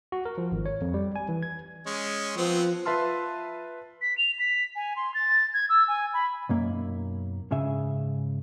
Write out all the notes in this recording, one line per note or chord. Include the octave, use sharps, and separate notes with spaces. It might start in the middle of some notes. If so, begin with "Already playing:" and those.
F#4
A#4
F3
G#1
C#5
F2
G3
G#5
E3
G#6
G#3 C#4
F3 B3 C4
F4 B4 E5 A5 C6 F6
B6
F7
B6
G#5
C6
A6
G#6
E6
G#5
B5
B1 F#2 A#3
G#2 C#3 G#4 E5